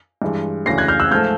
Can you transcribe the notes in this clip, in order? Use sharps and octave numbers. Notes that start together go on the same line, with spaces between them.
G2 E3 G#3
D2 C#3 E3 A#6 C7
F#6 G#6
F6 G6
E6 F#6
G#2 F3 A3 F6 G6